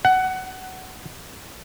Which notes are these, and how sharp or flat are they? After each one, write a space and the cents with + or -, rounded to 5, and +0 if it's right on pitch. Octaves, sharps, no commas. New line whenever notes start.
F#5 +15